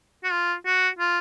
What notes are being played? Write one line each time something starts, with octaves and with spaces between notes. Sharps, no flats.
F#4
F4
F#4
F4